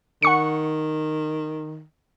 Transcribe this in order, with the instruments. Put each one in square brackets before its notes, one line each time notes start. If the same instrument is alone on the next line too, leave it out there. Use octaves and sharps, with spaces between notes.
[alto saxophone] D#3 [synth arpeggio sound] F#5 C#6 C#7